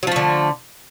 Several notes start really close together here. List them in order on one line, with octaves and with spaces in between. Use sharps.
F#3 F3 A3 D3